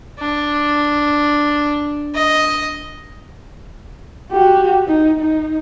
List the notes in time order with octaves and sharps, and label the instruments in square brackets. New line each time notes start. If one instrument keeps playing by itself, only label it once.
[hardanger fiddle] D4
D#5
[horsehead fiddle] F#4 G4
D#4
D#4